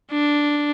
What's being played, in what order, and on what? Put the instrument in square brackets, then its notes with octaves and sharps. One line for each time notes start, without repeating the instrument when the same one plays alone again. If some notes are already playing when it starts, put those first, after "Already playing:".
[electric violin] D4